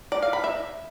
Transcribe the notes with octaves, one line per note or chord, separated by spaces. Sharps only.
D5
F5
B5
E5